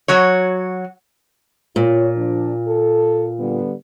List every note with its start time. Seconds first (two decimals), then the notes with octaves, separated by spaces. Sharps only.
0.08 F#3 F#4 C#5
1.76 A#2 F4 C#5
2.16 F3 D4
2.67 A4
3.39 D3 G3 B3